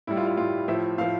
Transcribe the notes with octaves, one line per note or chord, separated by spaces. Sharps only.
A2 G3 E4
F4
F4
A2 G3 F4
A2 F3 E5
A2 F3 F5